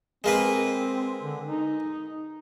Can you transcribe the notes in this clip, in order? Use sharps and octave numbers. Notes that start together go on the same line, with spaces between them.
G#3 A#3 C4 B4
D3
D#4